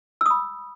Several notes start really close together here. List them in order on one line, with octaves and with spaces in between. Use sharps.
E6 D#6 B5